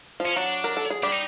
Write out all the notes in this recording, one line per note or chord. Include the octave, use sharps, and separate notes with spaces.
F3 F4
C#4
F#3 D4 F#4
A#4
A4
G#4
G3 D4 G4
D#4